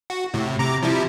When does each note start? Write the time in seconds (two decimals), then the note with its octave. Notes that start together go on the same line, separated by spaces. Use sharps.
0.10 F#4
0.34 A2 C3
0.58 C3 A#5 D6
0.83 F3 G3 E4